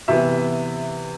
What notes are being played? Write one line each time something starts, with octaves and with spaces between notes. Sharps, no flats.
C3 E3 B3 E5